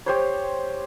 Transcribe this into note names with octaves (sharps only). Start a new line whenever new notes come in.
G4 C5 C#5